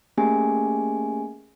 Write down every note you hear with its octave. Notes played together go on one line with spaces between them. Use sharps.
A3 A#3 C#4 G4 G#4 G#5